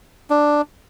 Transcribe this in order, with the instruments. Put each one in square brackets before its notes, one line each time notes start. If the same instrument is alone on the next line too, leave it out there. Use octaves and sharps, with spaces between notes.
[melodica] D4